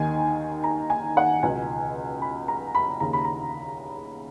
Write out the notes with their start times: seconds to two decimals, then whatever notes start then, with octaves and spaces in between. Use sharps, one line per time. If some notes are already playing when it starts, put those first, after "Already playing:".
Already playing: D#2 D#3 G#5
0.64 A#5
0.90 G#5
1.17 F#5
1.43 C#2 B2 G#5
2.22 B5
2.48 A#5
2.75 B5
3.00 D#2 C#3 A#5
3.13 B5
3.25 A#5